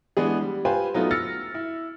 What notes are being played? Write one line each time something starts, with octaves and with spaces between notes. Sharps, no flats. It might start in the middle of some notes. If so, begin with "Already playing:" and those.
E3 G#3 B3 D4 G#4
G3
F4 G4 B4 C5 F5 G#5
F#3 A3 B3 D#4 F4
E6 F6 A6 A#6 C#7
E4